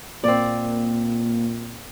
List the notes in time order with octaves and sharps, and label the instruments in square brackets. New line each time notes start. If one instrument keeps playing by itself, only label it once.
[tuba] A#2 [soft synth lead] A#3 [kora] C4 D5